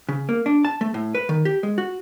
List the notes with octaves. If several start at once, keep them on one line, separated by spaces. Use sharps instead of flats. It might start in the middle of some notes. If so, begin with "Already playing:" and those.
C#3
A#3
D4
A5
A3
A2
B4
D#3
G4
G#3
F#4